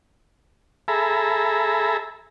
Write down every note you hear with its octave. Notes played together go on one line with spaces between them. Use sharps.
G#4 A4 E5 A#5 B5